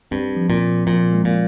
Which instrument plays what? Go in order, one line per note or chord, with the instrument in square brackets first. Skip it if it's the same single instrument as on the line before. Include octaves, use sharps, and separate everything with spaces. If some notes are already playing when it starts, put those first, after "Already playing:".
[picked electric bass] G2 [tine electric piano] C4
[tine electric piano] F3
[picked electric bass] A#2
[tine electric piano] F3
[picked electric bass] A#2 [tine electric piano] F3
[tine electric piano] G#3
[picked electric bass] A#2